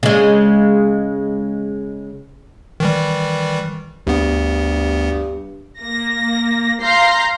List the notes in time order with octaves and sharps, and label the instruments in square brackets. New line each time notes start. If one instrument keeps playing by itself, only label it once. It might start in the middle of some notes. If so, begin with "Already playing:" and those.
[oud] C#3 G#3
[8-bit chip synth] D#3 E3 G3
[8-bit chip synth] D2 B3 [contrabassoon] G2
[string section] A#3 A#6
F5 A#5 C6 G6 A#6 C7